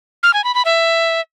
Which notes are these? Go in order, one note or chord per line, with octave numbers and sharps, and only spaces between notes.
F6
G#5
B5
B5
E5